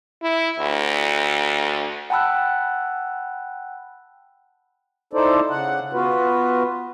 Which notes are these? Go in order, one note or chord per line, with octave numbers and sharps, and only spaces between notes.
E4
D2
F#5 G5 A5 B5 E6 F#6
D#4 E4 A4 C5 D5
C#3 F#5
B3 F4 F#4 B4